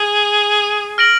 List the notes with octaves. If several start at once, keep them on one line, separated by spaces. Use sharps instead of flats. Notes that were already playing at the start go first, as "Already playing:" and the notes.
Already playing: G#4
F6 A#6 D7 F#7